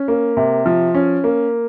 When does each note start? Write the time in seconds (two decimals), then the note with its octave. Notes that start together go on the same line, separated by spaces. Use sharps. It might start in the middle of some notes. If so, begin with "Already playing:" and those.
Already playing: C#4
0.08 A#3
0.37 C3
0.66 F3
0.95 C#4
1.24 A#3